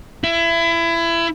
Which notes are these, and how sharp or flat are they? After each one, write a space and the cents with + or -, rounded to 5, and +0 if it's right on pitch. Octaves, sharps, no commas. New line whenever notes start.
E4 +25